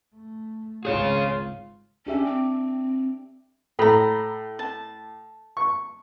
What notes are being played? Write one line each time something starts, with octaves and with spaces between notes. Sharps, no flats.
A3
G#1 C#2 F4 G#4 C#5
C#4 D4 G4 E5
C4
A2 A4 A#5 B5
A5
C#6